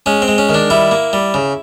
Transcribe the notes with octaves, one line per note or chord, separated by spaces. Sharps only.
G#3 C#4
C4
G#3
C#4
D#3
D4
G3 E4
A#3
G3
C#3